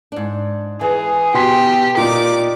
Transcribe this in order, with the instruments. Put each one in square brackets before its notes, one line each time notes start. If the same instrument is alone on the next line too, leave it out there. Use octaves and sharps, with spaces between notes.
[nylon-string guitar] G#2 D4
[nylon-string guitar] E3 [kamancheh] G#4
[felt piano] B2 C6 B6 [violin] G4
[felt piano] A#2 [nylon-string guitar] C4 [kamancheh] D#4 D5 [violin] D6